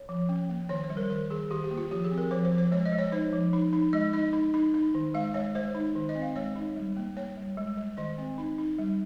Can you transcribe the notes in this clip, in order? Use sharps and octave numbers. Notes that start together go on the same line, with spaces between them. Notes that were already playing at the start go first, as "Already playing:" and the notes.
Already playing: C#5
F3
C#4
A#3
D#3 C#5
C5
G3
A#4
D#3 A#4
D#3 G#4
D#3 G4
G4
A#3
F4
F3 G4
G#4
C4
A#4
F3 C5
C5
F3
C5
G#3 C#5
D#5
G#3
C#5
D#4 C5
F3
D#4
D#4
G#3 D#5
D#4 D#5
D#4
D#4
D#4
D#3
G#3 F5
G#3 C#5
G#3 C5
D#4
D#3
D#5
C4
F5
G#3 C#5
D#4
G3
A#3
A#3 C#5
G3
G#3
G#3
D#3 D#5
C4
D#4
D#4
G3